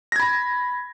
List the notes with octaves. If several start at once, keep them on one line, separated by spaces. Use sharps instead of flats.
B5 G#6 A#6